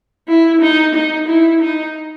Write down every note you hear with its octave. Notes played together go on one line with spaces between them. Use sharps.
E4
D#4
D#4
E4
D#4